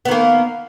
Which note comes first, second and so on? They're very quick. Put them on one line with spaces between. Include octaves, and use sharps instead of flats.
B3 D#3 A#3